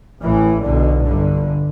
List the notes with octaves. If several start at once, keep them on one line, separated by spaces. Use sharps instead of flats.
A1 A2 E3
B1 B2 D3
G1 G2 D3